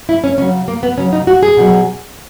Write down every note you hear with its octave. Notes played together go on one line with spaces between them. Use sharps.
E4
C#4
C#3 F#3 C#4
A#3
B3
C#3 F#3 C#4
D#4
F#4
G#4
B2 F#3